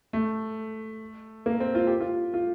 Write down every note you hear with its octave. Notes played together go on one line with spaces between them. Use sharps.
A3
A#3
C4
F4
G4
F4
F4